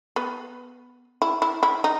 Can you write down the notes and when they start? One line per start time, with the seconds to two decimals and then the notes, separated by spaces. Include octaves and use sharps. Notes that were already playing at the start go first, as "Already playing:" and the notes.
0.16 B3
1.22 E4
1.42 E4
1.63 E4
1.84 D#4